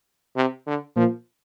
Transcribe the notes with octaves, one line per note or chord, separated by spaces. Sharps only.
C3
D3
A#2 F3